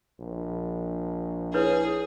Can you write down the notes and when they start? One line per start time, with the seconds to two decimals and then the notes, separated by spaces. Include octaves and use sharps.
0.20 A#1
1.54 E4 G#4 B4 C#5